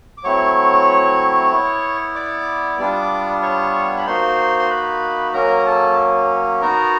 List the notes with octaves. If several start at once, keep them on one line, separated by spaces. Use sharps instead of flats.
D6
F#3 A3 C4 E4 C#5 C#6
B3 E4
D5 D6
G3 B3 D4 F4
C#5 C#6
B5
A#3 D#4 F#4 C5 C6
C6
B4 B5
F#3 A#3 C#4 A#4 A#5
A4 A5
B3 D#4 F#4 A#4 A#5